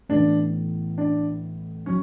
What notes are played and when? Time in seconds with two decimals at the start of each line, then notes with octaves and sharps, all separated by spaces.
0.09 A1 A2 E3 B3 D4
0.98 D4
1.86 F#3 C#4